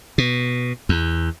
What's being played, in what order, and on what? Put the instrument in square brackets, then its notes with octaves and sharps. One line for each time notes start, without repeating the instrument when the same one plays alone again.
[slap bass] B2
E2